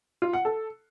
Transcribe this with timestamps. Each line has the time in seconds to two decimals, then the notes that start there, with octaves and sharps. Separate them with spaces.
0.22 F4
0.33 F#5
0.45 A4